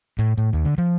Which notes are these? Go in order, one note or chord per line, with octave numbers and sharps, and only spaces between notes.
A2
A2
D#2
D3
F3